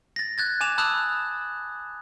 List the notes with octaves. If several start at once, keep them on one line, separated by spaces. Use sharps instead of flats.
A6 A#6
F#6 G#6 A6
G#5 D6 E7 F7
A5 B5 D#6 E6 F#6 F7